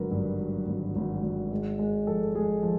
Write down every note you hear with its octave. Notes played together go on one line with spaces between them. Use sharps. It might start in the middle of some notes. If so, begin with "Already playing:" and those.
Already playing: G#1 D3 F#3 A#4 B4
G2
F#3
G#1
G#1
G#1
G#3
G#3
F3 A4
G#3 G#4
F3